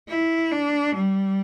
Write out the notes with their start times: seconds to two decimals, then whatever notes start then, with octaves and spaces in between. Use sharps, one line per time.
0.08 E4
0.51 D4
0.95 G3